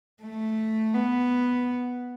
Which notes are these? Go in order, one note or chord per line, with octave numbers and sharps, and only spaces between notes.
A3
B3